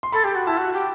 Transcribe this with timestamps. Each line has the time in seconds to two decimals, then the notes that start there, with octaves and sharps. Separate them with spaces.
0.03 C6
0.12 A4 B5
0.23 G4 C6
0.35 F#4
0.47 E4 A5
0.58 F#4
0.74 G4